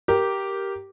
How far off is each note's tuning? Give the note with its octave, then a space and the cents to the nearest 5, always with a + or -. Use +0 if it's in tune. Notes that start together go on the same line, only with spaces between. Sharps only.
G4 -10 A#4 +0